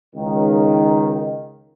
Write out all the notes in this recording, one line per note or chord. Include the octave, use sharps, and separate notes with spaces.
C#2 D#3